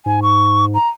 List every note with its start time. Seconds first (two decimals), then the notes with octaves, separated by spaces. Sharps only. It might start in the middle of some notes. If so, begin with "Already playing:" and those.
0.06 G#2 G#5
0.22 C#6
0.74 A#5